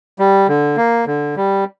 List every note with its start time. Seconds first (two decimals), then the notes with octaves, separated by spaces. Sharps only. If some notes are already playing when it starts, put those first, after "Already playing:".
0.19 G3
0.48 D3
0.77 A#3
1.07 D3
1.36 G3